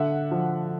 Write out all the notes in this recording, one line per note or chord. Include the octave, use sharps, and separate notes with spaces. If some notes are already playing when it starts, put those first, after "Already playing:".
Already playing: D3 E5 F#5
F3